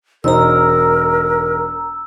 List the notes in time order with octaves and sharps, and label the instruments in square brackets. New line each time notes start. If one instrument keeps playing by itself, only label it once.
[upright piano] E1 D#4 C5 [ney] A#4 [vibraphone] A#5 E6